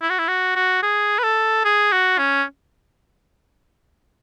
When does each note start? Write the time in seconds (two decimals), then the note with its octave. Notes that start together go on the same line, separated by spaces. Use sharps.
0.02 E4
0.10 F#4
0.19 E4
0.28 F#4
0.56 F#4
0.83 G#4
1.19 B4
1.23 A4
1.65 G#4
1.92 F#4
2.19 C#4